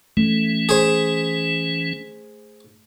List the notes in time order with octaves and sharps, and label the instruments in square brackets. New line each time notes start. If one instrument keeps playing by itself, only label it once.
[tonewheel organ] E3 C#4 [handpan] A3
[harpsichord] G#4 C5